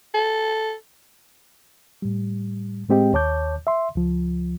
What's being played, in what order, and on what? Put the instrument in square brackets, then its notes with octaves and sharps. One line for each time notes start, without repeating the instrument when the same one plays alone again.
[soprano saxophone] A4
[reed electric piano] A2 G3
A2 G#3 C4 G4 D#5 G5
D#2 C#5 A5 D6 G6
E5 C6
C#2 F3